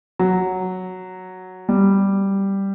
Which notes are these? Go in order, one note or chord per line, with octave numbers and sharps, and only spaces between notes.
F#3
G3